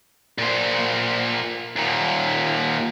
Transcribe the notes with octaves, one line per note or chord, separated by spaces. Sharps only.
A#2 C5
D#2 A#2